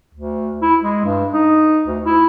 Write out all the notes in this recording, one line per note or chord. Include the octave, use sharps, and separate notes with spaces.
D2
E4
G#3
G2
D#4
D2
E4